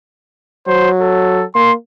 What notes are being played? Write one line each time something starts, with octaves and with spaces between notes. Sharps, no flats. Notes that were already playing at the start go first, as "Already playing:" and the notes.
F#3 C5
A4
A#3 C6